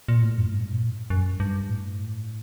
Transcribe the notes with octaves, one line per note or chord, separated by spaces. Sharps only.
A#2
A2
F#2
A2
G2
A#2
F#2
G2
A2